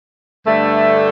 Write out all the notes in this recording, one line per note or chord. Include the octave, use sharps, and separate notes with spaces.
G2 D3 A3